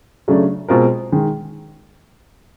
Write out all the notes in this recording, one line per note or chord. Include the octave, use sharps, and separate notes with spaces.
C#3 F#3 A3 D4
B2 G#3 C4 F4 A#4
D#3 G#3